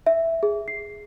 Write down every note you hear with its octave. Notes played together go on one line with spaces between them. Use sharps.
E5
G#4
C7